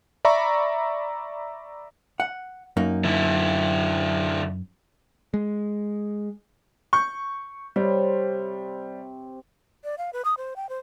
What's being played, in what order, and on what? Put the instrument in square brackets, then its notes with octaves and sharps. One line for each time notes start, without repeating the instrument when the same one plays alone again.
[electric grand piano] D5 E5 A#5 B5 C#6
[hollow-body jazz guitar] F#5
F#2 A#3 D#4
[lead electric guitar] D3 E4
[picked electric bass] G#3
[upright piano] C#6 G6
[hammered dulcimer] C3 C4 C#5 [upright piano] G3
[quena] D5
F5
B4
D#6
C5
G5
C5